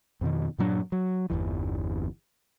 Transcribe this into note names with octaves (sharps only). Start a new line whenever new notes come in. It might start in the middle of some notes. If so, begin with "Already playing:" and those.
F2 B2 D#3
G2 A#2 F#3 D4
F#3
G1 E2 E3